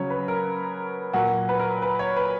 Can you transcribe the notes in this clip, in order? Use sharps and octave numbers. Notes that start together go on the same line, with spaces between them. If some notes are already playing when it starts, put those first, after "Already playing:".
Already playing: C#3 F#3 C#5
B4
A#4
A#2 F#3 F#4
B4
A#4
B4
C#5
B4